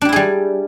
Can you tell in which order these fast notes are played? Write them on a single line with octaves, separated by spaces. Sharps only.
D4 G4 E4 G#4 G3